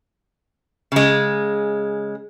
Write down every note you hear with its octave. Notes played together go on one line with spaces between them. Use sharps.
C#3 G#3